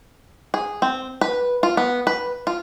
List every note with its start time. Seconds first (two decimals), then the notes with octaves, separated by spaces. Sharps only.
0.54 G#4
0.82 C4
1.21 B4
1.63 F4
1.77 B3
2.07 B4
2.47 F4